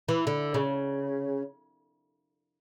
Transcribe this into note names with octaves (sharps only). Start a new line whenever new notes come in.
E3
D3
C#3